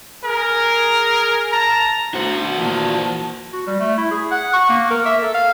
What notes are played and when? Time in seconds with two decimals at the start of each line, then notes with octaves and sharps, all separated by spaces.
0.23 G#4 A#4
1.52 A5 A#5
2.14 D2 B2 F#4 C5 F#5
2.59 A#2 E3 D#5 A5
3.53 F#4
3.67 G3
3.80 A3
3.98 E4
4.11 G#4
4.31 F#5
4.53 C#6
4.69 A#3
4.91 A#4
5.06 E5
5.22 A4
5.34 F5